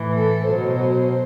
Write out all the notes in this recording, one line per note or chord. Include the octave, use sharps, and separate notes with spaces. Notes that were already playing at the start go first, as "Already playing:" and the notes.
Already playing: A2 E3
A4
B2 F#3 C5